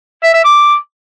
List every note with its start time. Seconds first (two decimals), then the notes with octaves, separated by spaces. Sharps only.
0.23 E5
0.34 E5
0.44 D6